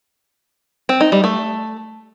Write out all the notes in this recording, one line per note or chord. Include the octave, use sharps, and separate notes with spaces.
C4
D#4
G3
A3